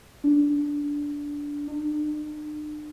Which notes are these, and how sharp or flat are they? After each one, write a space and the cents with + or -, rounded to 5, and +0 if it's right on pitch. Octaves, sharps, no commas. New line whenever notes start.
D4 -15
D4 +45